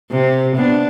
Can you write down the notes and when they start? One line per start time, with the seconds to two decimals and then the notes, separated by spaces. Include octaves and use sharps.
0.11 C3
0.56 B3 D4